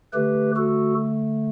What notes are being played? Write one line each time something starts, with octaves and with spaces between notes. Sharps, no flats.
D3 A3 G4 B4
F#4 A4